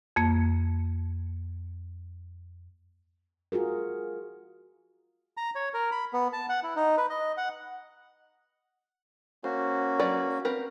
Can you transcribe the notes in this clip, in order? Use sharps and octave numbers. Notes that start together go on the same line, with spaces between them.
F2 A#3
F4 F#4 G#4 A#4
A#5
C#5
A#4
B5
B3
A5
F#5
E4
D#4
B4
D#5
F#5
A#3 C#4 F#4 C5
F#3 B4 D5
C4 A#4 B4